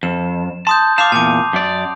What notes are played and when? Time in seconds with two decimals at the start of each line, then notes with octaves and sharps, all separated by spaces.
0.03 F2 E7
0.67 A5 C6 D#6 G6
0.98 F5 A5 D6 C7 F7
1.12 E2 A#2 A5 D6
1.53 F#2 D5